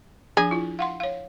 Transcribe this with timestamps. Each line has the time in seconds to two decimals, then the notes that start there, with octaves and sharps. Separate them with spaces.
0.37 F3 D4 G#4
0.51 E4 F4
0.79 F5 F#5 C6
1.00 C#5 F5